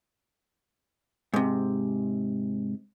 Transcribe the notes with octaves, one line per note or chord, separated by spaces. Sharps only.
G#2 C3